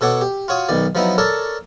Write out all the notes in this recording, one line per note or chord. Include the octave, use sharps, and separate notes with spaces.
B2 A4 C#5 F#5 D6
G4
F4 F#4 C#5 D#6
B1 B2 D#3 D5
F3 F#3 B3 D#4 E4
A4 A#4 C#5 D5 A5